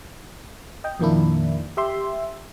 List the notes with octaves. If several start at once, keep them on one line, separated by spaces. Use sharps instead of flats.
D#5 G5
F2 A#2 D#3 A#3 D4 E4
G4 E5 C6